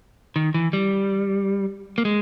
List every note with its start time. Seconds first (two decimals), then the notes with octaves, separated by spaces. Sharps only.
0.36 D#3
0.54 E3
0.73 G3
1.98 A#3
2.05 G#3